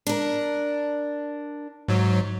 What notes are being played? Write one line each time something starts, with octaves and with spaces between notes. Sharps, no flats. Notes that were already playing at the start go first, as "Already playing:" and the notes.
D4 A#4
G#2 F#3